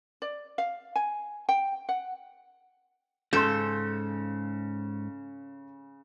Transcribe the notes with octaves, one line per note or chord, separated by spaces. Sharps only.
D5
F5
G#5
G5
F#5
G#2 C#3 A4 C6 G6